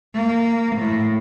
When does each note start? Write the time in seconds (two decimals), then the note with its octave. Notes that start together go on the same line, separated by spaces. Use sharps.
0.15 A#3
0.77 A2